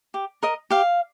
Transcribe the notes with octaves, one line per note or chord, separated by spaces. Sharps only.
G4
A#4 D#5
G4 F5